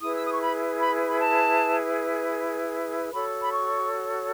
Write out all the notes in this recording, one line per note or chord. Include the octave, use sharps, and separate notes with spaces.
E4 G#4 B4 D#6
E6
D#6
C#6
B5
B5
B5
A5
F#4 A4 C#5 B5
B5
C#6